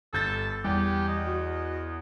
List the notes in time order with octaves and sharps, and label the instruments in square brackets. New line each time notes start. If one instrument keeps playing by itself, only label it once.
[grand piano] G1 G6 A6 [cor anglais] A4
[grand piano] E2 [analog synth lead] G3 [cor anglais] G4
[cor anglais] D#5
[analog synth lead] F#4